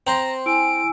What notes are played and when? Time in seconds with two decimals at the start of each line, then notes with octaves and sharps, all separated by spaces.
0.07 C4 C5 A#5
0.46 E4 G#5 E6 D7